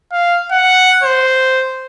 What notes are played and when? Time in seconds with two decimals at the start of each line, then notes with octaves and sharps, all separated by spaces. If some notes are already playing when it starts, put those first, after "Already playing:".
0.12 F5
0.52 F#5
1.03 C5